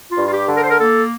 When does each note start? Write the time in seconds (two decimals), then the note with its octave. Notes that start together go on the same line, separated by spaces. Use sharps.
0.10 F4
0.18 G2
0.27 F4
0.33 G4
0.48 D3
0.56 A#4
0.63 C5
0.70 A#4
0.79 A#3 A4